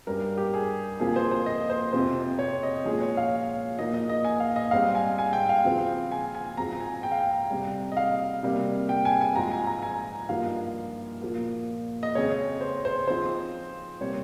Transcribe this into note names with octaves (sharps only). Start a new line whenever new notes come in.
G2 G3 C#4 A#4
G4
G#4
F2 C#3 F3 A#3 G#4
C5
C5
D#5
C5
F2 C3 F3 C5
C#5
D#5
A#2 F3 G#3 C#4 G#4
C#5
F5
A#2 F3 A#3 D#4 D#5
D#5
D#5
G#5
F5
D#5
G#2 G3 C4 F5
G#5
G#5
G5
F5
C#3 F3 C4
G#5
G#5
G#2 F3 C4 A#5
G#5
G5
F5
G5
F2 C3 G3
D#5
F5
C3 G3 A#3
G5
G#5
G#5
G#2 F3 G#3 A#5
G#5
A#5
G#5
G2 F3 A#3 D#4 F5
A#2 F3 A#3
D#5
F2 C#3 G#3 C#5
C5
C5
C#3 F3 C4 D#4 C5
C3 G3 A#3 C#5